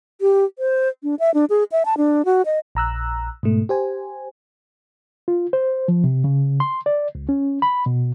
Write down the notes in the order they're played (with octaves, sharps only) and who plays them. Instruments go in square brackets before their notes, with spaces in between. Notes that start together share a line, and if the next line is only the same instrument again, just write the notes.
[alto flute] G4
C5
D4
E5
D4
G#4
E5
A5
D4
F#4
D#5
[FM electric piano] A#1 A#5 E6 F#6
G#2 B2 A3
G4 C5 G#5
[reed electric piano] F4
C5
F3
C3
C#3
C6
D5
C#2
C#4
B5
B2